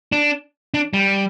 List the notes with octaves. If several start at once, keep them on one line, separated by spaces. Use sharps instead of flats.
D4
D4
G3